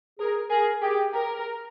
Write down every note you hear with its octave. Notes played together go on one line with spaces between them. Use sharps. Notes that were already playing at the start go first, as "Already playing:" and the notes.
G#4 A#4
G#4 A#4
G4 G#4
A#4